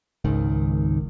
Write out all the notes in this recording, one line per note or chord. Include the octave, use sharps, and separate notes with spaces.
G#1 C#2 D#3